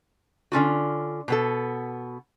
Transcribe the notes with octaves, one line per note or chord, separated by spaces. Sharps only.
D3 C#4 F4 F#4
B2 B3 A4